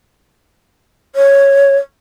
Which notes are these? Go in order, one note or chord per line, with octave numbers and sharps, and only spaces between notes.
C#5